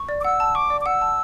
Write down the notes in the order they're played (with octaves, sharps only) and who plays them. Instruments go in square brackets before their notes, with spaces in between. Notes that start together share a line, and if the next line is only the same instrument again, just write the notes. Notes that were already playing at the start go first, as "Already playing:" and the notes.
Already playing: [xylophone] C#6
D5
[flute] D6
[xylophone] F#5 [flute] E6
[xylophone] A5
[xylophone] C#6 [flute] D6
[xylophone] D5
[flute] D6
[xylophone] F#5 [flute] E6
[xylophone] A5